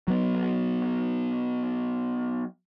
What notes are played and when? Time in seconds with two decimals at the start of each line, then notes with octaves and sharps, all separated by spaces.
0.08 F#3 B3